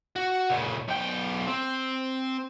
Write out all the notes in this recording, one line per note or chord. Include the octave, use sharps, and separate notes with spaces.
F#4
A#2 C#3
B1 G5
C4